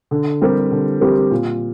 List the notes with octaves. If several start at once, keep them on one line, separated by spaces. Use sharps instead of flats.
D3
G3 C4 G4 A#4
D3
G3 C4 G4 A#4
A#2